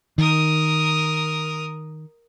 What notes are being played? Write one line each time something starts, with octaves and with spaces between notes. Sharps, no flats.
D#3 A#4 D#6